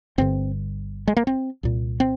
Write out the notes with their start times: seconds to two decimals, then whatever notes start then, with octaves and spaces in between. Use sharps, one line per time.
0.18 G1 G2 D3 C4
1.08 G#3
1.17 A#3
1.27 C4
1.63 C2 A#2
2.00 C4